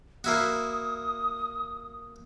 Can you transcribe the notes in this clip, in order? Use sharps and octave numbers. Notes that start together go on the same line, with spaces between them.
A#3 E4 F#4 D#6